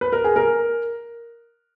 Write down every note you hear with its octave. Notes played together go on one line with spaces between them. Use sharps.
B4
A#4
G#4
A#4